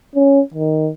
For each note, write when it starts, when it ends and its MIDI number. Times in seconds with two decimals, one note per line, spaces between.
0.15 0.41 61
0.54 0.90 51